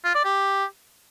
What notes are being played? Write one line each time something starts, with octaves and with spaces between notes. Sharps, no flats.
F4
D5
G4